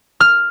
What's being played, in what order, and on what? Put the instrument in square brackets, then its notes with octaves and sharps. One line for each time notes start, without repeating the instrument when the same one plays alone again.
[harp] F6